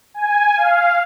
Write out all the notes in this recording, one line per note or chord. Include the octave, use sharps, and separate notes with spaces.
G#5
F5